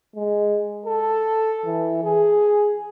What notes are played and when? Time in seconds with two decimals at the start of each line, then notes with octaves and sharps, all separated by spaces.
0.16 G#3
0.86 A4
1.66 E3
2.04 G#4